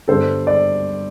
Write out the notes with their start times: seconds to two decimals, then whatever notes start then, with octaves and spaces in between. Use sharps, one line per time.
0.08 G2 D3 G3 B3 A4 C5
0.47 D5